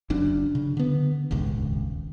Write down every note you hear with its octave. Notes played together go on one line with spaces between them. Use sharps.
F#1 F#2 D4
C#3
D3 B3
D#1 G#1 C#2